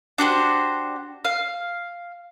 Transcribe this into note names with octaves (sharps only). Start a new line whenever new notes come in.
D4 F#4 G4 C5
F5